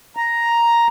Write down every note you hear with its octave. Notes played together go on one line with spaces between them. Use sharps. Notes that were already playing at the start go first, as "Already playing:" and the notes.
A#5